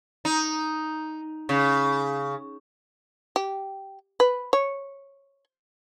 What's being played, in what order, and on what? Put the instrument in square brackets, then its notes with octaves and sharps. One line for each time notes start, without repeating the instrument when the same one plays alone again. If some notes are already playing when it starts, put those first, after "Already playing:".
[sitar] D#4
C#3
[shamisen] G4
B4
C#5